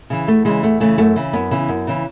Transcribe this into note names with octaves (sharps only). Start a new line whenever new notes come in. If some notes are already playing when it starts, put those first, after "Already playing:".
C#3 E3
E2 A3
C#3 E3 G#3
E2 A3
C#3 E3 A3
F#2 A3
C#3 E3
F#2 B3
C#3 E3
F#2
C#3 E3